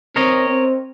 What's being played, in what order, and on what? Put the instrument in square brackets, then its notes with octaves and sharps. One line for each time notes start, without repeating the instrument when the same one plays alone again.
[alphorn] C4 [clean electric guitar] A#4 C#5 D#5
[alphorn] C4